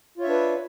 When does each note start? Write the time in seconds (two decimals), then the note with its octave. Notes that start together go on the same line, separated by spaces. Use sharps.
0.18 F4
0.20 C#5
0.23 E5
0.26 D4
0.29 B4